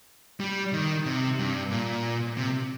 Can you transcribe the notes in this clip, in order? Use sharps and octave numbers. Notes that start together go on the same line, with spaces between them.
G3
D#3
C3
G2
A#2
C3